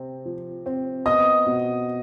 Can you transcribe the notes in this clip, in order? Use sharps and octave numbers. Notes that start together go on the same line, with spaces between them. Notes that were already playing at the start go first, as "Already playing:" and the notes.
Already playing: C3 C4
F3
C4
B3 D#5 D#6
B2